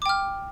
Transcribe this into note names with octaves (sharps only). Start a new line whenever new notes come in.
G5 D6 F6